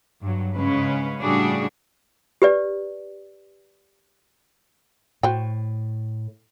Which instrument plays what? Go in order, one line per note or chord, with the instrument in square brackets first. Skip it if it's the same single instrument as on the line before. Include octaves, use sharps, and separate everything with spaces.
[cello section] G2 F#3
G#2 C#3 G#3 C#4 B4
A2 C#3 G3 D4 F#4 G#4
[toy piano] G4 B4 D5
[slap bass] A2 [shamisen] F#4 C5 G5